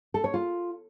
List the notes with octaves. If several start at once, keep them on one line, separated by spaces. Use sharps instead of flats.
A4
C#5
F4